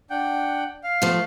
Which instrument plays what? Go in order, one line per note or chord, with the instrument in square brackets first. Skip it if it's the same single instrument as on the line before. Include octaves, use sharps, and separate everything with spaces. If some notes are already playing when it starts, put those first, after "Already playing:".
[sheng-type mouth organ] D4 F#5 G5
F5
[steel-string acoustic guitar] F3 A3